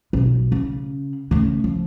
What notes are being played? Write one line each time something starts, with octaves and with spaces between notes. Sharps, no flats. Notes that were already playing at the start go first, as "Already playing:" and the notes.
B1
C#3
C#3 A3
F3